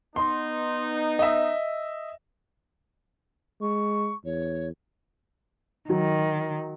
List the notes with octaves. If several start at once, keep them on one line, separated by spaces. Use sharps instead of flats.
B3 D#4 C6
D#5 E5
G#3 C#6
E2 C#5
D#3 F#3